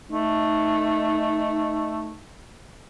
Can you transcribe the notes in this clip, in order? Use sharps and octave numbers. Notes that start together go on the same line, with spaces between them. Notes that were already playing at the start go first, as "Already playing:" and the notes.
A3 D#4